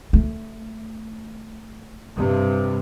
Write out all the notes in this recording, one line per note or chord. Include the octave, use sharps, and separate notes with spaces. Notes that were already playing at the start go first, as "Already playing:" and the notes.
A3
G2 C3